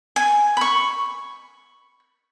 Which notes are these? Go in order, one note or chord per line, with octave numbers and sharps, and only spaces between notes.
G#5
B5 C#6